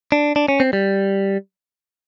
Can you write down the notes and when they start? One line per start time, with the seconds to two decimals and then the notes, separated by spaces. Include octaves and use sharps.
0.12 D4
0.36 D4
0.48 C#4
0.60 C4
0.73 G3